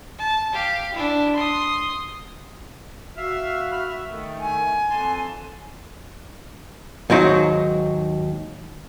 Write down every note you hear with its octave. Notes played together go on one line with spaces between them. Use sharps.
A5
G4 F5
D4 E4
C6 D#6
F#4 E5 F5
B5 F6
E5
D#3 A3
G#5
F2 A5 C6
D#2 G#2 F#3 D#4